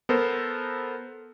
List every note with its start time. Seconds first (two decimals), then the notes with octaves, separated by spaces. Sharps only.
0.09 B3 A4 A#4 C5